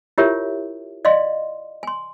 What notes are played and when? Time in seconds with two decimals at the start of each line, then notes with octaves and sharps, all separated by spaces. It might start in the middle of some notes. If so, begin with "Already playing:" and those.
0.18 E4 F4 G4 A#4 C#5 E5
1.05 D5 D#5 F5 C6
1.83 G#5 C6